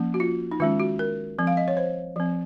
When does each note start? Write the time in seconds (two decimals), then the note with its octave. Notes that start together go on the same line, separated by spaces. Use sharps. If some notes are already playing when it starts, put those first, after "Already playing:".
Already playing: F3 A#3 C#4
0.14 F#4
0.20 F4
0.51 D#4
0.60 D#3 G#3 C#4 F4
0.80 F#4
0.99 A#4
1.39 F3 C4
1.47 F5
1.57 D#5
1.68 C#5
1.77 C5
2.16 F3 C4